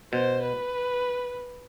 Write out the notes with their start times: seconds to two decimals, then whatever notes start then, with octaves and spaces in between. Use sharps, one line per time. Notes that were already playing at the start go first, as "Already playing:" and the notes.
0.13 B2 C5
0.42 B4